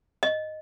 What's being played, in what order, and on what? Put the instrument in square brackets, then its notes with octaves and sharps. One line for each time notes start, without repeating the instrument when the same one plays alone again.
[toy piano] D#5